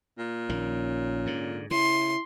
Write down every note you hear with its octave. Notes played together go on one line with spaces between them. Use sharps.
A#2
A#1 D#3 C#4
G#2 D3
C#3 E4 C6